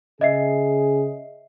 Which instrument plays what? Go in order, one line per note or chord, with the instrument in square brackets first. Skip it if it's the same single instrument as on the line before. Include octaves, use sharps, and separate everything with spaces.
[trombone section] C#3 G#4 [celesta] D#5 E5 C7